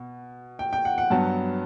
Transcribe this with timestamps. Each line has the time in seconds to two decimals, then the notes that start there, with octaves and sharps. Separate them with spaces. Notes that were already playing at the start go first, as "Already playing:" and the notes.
Already playing: B2
0.59 G5
0.73 G5
0.85 F#5
0.98 F#5
1.10 G2 F#3 B3 A5